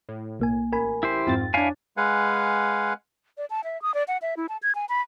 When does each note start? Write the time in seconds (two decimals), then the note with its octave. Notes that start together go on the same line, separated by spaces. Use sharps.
0.09 A2
0.40 B1 A#3 G#5
0.72 A1 A#4 G#5 B5
1.03 E4 G4 C5
1.27 F2 G#2 C4 F4 A6
1.54 D4 E4 C#5 F5 G#5
1.97 G#3 B4 F5 F#5 G#5
3.38 D5
3.50 A5
3.64 E5
3.82 D#6
3.94 D5
4.08 F#5
4.22 E5
4.37 E4
4.49 A5
4.63 G#6
4.75 G#5
4.89 B5